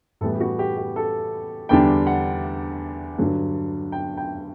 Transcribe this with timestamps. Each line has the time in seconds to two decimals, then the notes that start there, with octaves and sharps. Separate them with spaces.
0.21 A2 E3 G3 B3 A4
0.35 G4
0.40 F#4
0.59 G4
0.77 G4
0.96 A4
1.69 E2 D3 G3 D4 G5
2.07 F#5
3.18 G2 D3 F#3
3.92 G5
4.17 G5